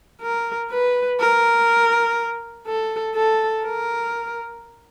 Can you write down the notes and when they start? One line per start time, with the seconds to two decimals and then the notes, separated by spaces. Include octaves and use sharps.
0.21 A#4
0.71 B4
1.20 A#4
2.67 A4
3.15 A4
3.64 A#4